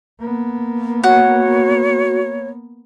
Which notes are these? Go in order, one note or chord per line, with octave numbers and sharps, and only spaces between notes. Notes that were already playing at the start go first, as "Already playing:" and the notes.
A#3 B3
F#4 C#5 F#5